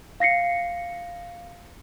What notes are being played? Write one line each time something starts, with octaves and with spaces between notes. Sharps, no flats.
F5 A#6 C7 C#7